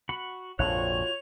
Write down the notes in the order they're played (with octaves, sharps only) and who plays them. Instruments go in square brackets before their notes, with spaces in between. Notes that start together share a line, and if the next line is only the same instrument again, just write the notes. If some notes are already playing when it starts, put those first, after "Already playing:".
[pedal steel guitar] F#4 F#5 B5
[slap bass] A#1 F2 G#2 [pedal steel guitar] F4 F#4 F#6 [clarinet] C#5 [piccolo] F7